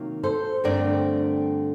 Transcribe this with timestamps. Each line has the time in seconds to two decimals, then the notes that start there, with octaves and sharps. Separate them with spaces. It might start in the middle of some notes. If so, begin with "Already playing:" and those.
Already playing: C3 D#3 F#3 A#3
0.23 A4 C5
0.64 G2 D3 A3 C4 A#4 D5